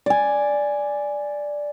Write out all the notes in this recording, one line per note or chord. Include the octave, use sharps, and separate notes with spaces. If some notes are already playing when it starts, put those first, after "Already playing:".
D5 G#5